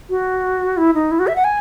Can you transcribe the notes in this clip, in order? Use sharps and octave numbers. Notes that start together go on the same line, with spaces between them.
F#4
E4
D#4
E4
F#4
E5
F#5
G#5